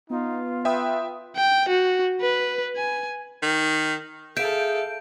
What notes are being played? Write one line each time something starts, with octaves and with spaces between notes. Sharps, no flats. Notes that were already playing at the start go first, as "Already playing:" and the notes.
B3 D#4 F4
B4 E5 G5 D#6
G5
F#4
B4
G#5
D#3
G#4 A4 E5 F5 G6 D7